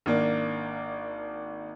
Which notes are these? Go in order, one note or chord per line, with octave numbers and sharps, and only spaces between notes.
G#1 A#3 D4